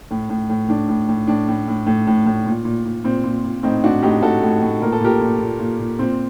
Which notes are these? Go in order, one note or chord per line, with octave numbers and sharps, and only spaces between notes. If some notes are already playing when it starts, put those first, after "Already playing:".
A2
A2
A2
A2 D4
A2
A2
A2 D4
A2
A2
A2
A2
A2
A#2
A#2
A#2
A#2 C4
A#2
A#2
A2 C4 D#4
A2 D4 F#4
A2 D#4 G4
A2 F#4 A4
A2
A2
A#2 A#4
A4
A#2 G4 A#4
A#2
A#2
A#2
A#2
A#2 C4